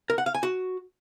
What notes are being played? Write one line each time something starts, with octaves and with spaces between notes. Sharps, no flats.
A#4
F#5
F5
G#5
F#4